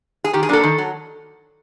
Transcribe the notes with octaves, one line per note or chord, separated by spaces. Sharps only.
G#4
D#3 G4
G#4
F#3 A#3 D4 A4
D#3
F#3